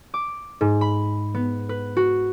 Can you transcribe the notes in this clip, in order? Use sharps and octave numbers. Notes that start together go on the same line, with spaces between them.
D6
G#2
B5
B3
B4
F#4